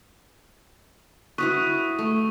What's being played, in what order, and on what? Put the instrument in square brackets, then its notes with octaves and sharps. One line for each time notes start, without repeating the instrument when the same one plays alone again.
[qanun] E4 F#4 B4 [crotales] C#6 D#6
[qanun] A3